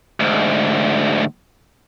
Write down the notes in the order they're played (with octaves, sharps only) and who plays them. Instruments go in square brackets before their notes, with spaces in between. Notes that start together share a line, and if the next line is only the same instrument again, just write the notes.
[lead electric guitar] D2 G#2